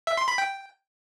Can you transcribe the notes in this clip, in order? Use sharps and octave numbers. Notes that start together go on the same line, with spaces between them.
E5
C6
B5
G5